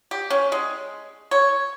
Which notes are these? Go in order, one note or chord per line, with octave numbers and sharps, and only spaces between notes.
G4
C#4
G#3
C#5